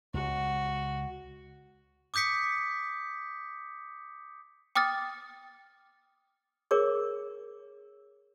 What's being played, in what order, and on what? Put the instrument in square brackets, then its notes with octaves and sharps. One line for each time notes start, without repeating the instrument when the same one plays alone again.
[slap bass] C#2 [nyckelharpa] F#4
[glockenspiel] D6 D#6 G6 B6 C#7
[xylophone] G5 D6 D#6 F6 A6
[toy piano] G#4 A#4 C#5 D6